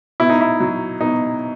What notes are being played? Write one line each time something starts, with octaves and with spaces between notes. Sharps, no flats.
B2 E4
D#4
E4
F#3
B2 D#4